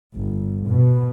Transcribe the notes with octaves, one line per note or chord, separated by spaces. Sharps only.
G1
B2